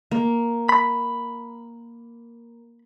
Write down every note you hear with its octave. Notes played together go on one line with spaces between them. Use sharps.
A#3
B5